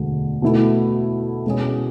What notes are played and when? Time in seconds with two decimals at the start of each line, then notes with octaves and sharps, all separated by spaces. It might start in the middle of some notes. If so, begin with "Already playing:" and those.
Already playing: E1 D2 D3 G#3
0.42 B2 A3 E4 A4
1.46 B2 G#3 C#4 G#4